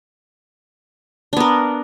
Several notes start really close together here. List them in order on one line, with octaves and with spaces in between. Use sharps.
D4 B3 A#4